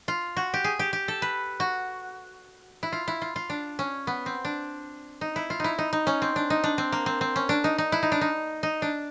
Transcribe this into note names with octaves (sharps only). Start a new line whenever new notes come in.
F4
F#4
G4
G#4
G4
G4
A4
B4
F#4
E4
F4
E4
F4
F4
D4
C#4
B3
C4
D4
D#4
E4
F4
D#4 E4
D#4
D#4
C#4
C4
D4
D#4
D4
C4
A#3
C4
C4
C#4
D4
D#4
D#4
E4
D#4
D4
D#4
D#4
D4